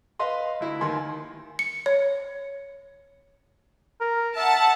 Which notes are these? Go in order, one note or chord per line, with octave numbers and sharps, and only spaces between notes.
B4 D#5 F5 C6
D2 E4
D#2 D#3 G#5 C6
C#7
C#5
A#4
E5 F#5 A5